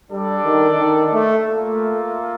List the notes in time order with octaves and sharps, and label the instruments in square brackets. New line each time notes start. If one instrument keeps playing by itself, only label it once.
[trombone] G3 [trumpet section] D4 A4 D5
[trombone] D#3
D#3
A3
[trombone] A3 [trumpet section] A#3 F4 A4